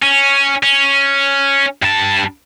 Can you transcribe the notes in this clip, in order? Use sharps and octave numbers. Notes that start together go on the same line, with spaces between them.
C#4
C#4
G2 A5